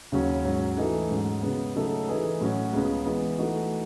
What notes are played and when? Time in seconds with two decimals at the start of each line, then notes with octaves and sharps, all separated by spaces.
0.12 D#2 C#3 F#3 C#4
0.45 G#2 F#3 C#4
0.77 E3 A3 D#4 A4
1.10 G#2 F#3 C#4
1.42 C#3 G#3 B3
1.76 C#3 F#3 A3 D#4 A4
2.08 E3 A3 D#4 G#4 B4
2.41 A2 F#3 C#4 F#4
2.73 C#2 C#3 G#3 B3
3.06 E3 G#3 B3
3.38 E3 A3 D#4 F#4